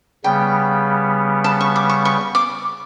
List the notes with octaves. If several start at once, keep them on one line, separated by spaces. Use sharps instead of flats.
C#3 G3 B3 G5
A5
C#6
D6
C#6
C#6
D6